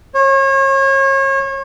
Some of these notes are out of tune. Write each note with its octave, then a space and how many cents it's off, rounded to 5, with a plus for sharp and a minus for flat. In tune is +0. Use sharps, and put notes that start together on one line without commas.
C#5 -35